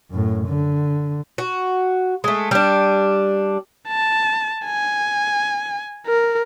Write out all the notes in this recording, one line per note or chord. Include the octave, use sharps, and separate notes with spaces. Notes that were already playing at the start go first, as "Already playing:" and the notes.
F#2 A2
D3
F#4
G#3 A3
G3 D4
A5
G#5
A#4